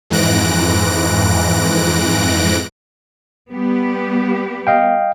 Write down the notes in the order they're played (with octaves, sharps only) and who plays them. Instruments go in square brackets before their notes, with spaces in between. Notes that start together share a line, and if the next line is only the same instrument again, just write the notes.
[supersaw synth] F2 G#2 E3 F#6 A#6 D7
[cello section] G3 B3 G4
[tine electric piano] D#5 F5 G5